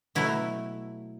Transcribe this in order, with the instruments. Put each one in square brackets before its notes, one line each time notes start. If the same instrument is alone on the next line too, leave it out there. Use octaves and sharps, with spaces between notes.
[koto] B2 F#3 A3 E4